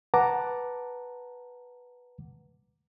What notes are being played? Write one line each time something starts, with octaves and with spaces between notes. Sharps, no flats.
B4 F#5 A5 A#5 D6